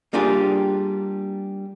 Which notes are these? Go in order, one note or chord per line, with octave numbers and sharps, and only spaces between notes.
G3 A#3 D4 F4 G4 G#4